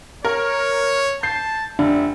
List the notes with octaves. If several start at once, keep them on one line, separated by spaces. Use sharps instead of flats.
A#4 C#5
A5 G6 C7
F1 D4 E5